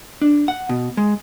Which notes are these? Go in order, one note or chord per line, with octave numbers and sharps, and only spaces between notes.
D4
F#5
B2
G#3